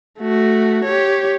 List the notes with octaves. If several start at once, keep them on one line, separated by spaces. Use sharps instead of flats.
A3 F#4
G4 C#5